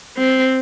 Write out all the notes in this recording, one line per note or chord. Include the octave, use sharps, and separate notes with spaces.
C4